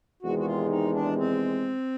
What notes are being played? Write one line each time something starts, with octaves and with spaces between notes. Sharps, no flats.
E2 C3 D#3 G#3 F#4
F#4
F4
D#4
D4
C4